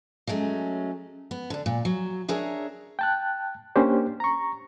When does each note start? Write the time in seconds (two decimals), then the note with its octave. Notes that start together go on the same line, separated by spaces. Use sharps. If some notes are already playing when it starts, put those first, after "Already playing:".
0.27 F#3 G#3 A3 C#4
1.31 B3
1.50 D3 D4
1.66 A#2
1.85 F#3
2.28 D4 G#4 A#4 C#5 E5
2.99 G5 A5 F#6
3.76 A#3 C#4 D4 G4 C5
4.20 A#5 C#6